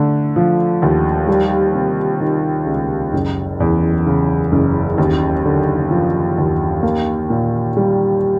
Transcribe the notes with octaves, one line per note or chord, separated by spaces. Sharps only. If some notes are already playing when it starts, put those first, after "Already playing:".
Already playing: D3 A3
F3
D#2
G3
C3
D#3
C#2
F#1
E2
C#3
F#1
D#2
D3
F3
D#2
A#3
A#2
G3